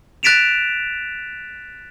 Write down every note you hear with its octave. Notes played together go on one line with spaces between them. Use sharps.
F#6 A6 B6 D7 E7 F7